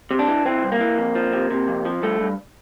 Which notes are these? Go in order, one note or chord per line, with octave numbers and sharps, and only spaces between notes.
C3
D4
E3
E3 C4
C2
A#3
E3
F2
F3
C3
C3
F2
F3
G2 A3
G2